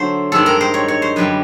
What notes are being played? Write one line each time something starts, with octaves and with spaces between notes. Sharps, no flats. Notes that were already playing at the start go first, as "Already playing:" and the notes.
Already playing: D3 F#3 A3 C5
G2 D#3 G#3 C4 A4
A#4
C5
C#5
C#5
C5
F#2 D3 G3 B4